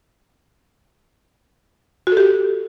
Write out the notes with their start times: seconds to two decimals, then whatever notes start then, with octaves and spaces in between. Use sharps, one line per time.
2.07 F#4
2.12 A4
2.17 G4